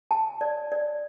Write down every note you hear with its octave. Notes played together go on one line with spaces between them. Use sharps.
A5
D5
D5